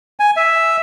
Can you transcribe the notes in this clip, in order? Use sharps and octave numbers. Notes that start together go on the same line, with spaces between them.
G#5
E5